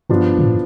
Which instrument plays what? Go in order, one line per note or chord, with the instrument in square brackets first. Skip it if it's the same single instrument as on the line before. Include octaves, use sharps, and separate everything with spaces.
[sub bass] G2 [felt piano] F3 B3 D4
[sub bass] B2
A2